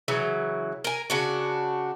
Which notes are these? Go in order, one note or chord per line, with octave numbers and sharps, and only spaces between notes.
C#3 E3 F#3
A#4 G#5
C#3 D4 F#4